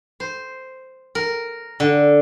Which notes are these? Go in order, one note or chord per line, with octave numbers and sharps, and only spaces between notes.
C5
A#4
D3